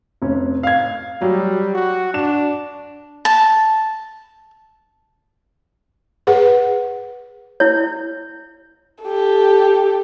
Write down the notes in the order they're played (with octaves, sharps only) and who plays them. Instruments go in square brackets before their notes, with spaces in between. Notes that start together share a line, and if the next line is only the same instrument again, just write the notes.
[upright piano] F1 C#4
F5 G#6
[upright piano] F#3 [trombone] G3
[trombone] F#4
[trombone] D4 [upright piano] E7
[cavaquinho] A5
[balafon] G#4 B4 F#5
[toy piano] E4 C#5
[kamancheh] G4 A4